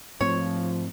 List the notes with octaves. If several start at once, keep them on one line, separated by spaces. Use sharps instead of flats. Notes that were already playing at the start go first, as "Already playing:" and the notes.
G#2 F3 A3 C4 C#5